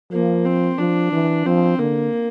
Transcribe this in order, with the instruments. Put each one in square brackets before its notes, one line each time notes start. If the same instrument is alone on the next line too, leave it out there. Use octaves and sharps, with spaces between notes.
[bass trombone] F3 [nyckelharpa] A#3
[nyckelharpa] C4
[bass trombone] F3 [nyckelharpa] D4
[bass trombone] E3
[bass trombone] F3 [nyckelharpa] C4
[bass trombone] D3 [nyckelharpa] A#3